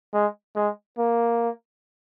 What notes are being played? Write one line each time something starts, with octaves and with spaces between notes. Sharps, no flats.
G#3
G#3
A#3